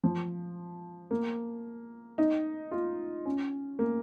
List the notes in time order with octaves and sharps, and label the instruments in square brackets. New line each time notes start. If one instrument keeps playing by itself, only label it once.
[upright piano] F3
A#3
D#4
F4
C#4
A#3